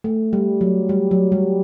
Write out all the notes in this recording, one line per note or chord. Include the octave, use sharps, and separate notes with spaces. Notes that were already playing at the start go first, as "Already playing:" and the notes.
A3
G3
F#3
G3
F#3
G3